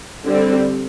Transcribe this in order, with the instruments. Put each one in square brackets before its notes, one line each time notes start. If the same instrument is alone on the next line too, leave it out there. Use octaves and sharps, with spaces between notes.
[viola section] D3 G3 C4